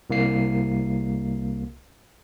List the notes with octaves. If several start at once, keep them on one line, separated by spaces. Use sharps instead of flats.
C2 A#3 C7